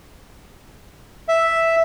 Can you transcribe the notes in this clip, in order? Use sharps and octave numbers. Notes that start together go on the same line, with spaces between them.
E5